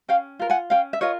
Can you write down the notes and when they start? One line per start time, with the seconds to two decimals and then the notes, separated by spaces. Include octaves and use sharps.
0.08 C#4 F5 G5
0.39 F4 A#4
0.50 F#5 G#5
0.70 C#4 F5 G5
0.93 E5
1.01 F4 A#4 C#5 D#5